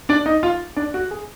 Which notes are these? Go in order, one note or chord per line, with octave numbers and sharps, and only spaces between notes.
D4 D5
D#4 D#5
F4 F5
D4 D5
F#4
G#4